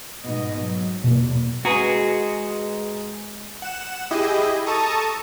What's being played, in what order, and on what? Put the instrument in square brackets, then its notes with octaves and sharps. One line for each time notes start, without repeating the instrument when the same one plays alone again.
[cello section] G#2 B2 D#5
F#3
[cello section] E2 [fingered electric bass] B2 A#3
[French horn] G#3 [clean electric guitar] F#4 G#4 [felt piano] B4 G#5 A#5
[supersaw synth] F#5 E7
E4 G4 G#4 D#5
A4 A5 A#5 C#6 D#6